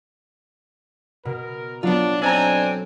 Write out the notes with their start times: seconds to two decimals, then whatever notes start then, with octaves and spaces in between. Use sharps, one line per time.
1.25 B2 A#4
1.83 F#3 B3 D4 F4
2.22 C4 D4 D#4 A4 D5 G#5 A#5